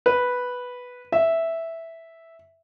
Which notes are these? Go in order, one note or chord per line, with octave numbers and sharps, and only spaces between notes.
B4
E5